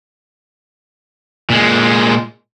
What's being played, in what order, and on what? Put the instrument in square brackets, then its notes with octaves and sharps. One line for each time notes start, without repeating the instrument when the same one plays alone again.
[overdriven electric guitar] A#2 G#3